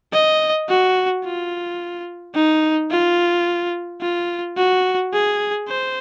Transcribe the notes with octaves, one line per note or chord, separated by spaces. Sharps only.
D#5
F#4
F4
D#4
F4
F4
F#4
G#4
C5